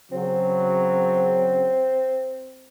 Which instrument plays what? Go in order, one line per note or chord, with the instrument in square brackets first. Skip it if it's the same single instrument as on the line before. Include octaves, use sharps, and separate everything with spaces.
[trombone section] C#3 F#3 [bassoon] C4